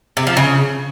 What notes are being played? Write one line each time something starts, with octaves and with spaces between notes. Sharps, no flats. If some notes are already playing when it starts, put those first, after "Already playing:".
C3
F3
C#3